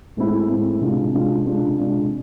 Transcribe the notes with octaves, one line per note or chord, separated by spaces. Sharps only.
A2 G#3 C4 E4
A2 G#3 C4 E4
C3 G#3 D4 F4
C3 G#3 D4 F4
C3 G#3 D4 F4
C3 G#3 D4 F4